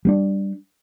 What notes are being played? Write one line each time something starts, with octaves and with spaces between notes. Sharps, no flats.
G3 A#3 D4